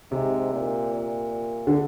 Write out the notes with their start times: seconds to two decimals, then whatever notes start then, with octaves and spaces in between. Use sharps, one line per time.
0.11 G#2 C3
0.53 A#2
0.94 A#2
1.67 D3